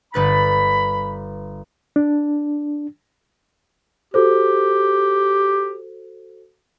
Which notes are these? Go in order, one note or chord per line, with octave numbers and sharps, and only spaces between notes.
G1 B4 B5 A6
D4
F#4 G4 A4 C5